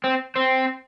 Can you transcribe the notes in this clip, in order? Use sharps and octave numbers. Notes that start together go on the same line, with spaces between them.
C4
C4